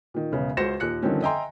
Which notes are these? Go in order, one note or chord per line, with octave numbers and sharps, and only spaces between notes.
A#2 D#3
E1 C#3 B3
C#2 F#4 C5 A#6 C#7 E7
D#2 A#2 F#6 C#7
G2 D3 D#3 F3 C4 C#4
D#5 E5 G5 G#5 A#5 C6